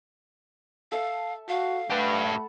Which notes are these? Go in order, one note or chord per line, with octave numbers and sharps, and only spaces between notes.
A4 E5 F5 A5
F#4 F5
A3 G4 B4 F#5 A5 B5